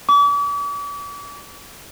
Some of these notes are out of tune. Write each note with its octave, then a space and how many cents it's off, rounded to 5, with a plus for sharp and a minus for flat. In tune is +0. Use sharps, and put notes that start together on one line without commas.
D6 -45